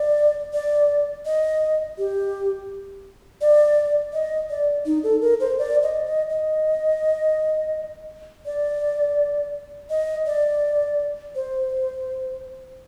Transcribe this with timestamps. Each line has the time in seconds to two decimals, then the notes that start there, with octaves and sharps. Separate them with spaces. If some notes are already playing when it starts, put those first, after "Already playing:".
Already playing: D5
0.54 D5
1.26 D#5
1.98 G4
3.41 D5
4.13 D#5
4.50 D5
4.86 D#4
5.04 A4
5.22 A#4
5.40 C5
5.59 D5
5.83 D#5
6.06 D#5
6.30 D#5
8.46 D5
9.90 D#5
10.26 D5
11.35 C5